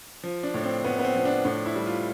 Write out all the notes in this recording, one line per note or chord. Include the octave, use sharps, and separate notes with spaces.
F3
D4
A2
C4
A2 B3
B3
C4
F3 C4
D4
A2 D4
E4
G3
F4